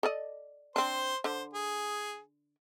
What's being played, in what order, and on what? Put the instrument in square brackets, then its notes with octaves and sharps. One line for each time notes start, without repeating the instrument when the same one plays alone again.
[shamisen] A4 D5 D#5
[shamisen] C4 D4 [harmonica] C5 C6
[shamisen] D3 [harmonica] C5
[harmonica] G#4